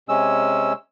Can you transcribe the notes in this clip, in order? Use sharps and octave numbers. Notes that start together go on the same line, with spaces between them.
C3 G#3 C#4 E6